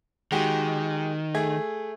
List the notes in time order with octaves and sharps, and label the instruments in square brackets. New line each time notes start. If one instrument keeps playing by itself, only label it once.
[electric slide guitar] D#3 [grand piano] G#3 F#4 G4
[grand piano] A3 G#4 G#6